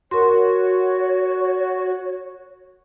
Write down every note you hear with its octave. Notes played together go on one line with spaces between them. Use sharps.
F#4 A#4 C#5 C6